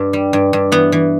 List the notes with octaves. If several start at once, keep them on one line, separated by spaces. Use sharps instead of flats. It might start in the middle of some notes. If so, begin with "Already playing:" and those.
Already playing: G2
G3
G2
G2
E3 B3
E3